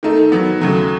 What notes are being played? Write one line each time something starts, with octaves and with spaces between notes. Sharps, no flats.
D#3 A3 D#4 A4
D#3 F#3 B3
D#2 C#3 F#3 A3